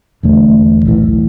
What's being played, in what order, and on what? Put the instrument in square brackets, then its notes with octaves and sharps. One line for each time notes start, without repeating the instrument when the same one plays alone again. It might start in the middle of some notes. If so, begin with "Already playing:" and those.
[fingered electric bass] E1 E2 D3 A3
B1 A2 E3